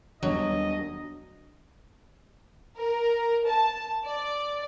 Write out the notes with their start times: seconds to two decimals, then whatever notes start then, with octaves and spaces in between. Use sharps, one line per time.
0.23 D#2 F#3 G3 B3 D4 D#5
2.76 A#4
3.46 A5
4.03 D5